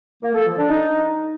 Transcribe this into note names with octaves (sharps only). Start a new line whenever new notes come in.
A#3
A4
F3
D4
D#4